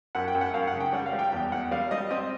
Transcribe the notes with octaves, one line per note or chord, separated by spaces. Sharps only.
F#2 F#5
G5
F#2
F#5
F#2 F5
F#5
C#3
G5
G3 F#5
F5
G3
G5
E2 G5
E2 F#5
G3 F5
G3 D#5
C4 D#5